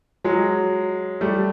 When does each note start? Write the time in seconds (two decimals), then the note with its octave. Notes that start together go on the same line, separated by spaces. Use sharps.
0.24 F#3 G#3
1.21 G3 A3